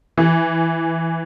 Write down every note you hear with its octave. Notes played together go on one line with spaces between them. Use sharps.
E3